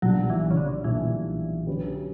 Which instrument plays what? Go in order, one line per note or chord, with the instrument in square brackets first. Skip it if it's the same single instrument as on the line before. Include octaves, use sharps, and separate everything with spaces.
[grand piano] B1 A#2 G3 A#3 D4 [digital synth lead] F#3
[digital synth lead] E3
C#3
D3
[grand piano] B1 A#2 G3 A#3 D4 [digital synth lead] E3
[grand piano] D3 F#3 C#4 G4 B4